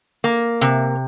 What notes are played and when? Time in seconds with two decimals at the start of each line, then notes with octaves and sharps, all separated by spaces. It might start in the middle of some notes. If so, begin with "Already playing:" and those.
0.24 A#3
0.61 C3